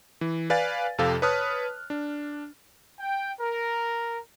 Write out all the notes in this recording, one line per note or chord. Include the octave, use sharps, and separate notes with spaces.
E3
B4 D5 F5 G#5 A6
F2 C3 A4 F5
B4 C#5 A5 D#6 F6 F#6
D4
G5
A#4